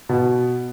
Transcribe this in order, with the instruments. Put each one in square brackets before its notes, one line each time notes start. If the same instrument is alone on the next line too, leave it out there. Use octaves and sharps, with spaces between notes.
[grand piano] B2